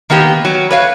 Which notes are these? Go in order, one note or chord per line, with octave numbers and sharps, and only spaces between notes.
D#3 A#3 B3 G4
F#3
B4 C#5 F5